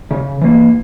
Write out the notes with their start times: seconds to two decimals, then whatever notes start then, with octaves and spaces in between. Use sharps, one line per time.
0.11 C#3
0.41 E3 A#3